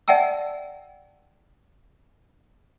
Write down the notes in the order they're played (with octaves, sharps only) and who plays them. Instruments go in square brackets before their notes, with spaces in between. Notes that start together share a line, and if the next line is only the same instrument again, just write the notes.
[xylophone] D5 E5 F#5 G5 A5 E6